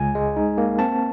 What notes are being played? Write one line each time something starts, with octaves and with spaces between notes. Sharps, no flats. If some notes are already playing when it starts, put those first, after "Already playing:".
Already playing: C#2 G#5
G#3
D#4
A#3
C4 A5